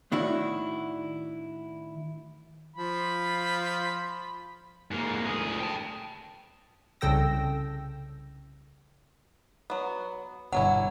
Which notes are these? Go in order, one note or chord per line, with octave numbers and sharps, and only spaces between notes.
A2 D#3 D4 E4 F#4
F3 F4 B5
G#2 A#3
D2 G#4
G5 A5
C2 C#3 A4 G5 E6 A#6
F#3 B3
G1 B2 F#3 C#4 E4 F#5